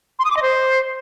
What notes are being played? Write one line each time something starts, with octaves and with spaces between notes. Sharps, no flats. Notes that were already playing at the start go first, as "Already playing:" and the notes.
C6
D#6
D6
D#5
C5